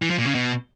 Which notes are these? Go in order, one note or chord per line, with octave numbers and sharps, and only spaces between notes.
E3
F3
A#2
C#3
B2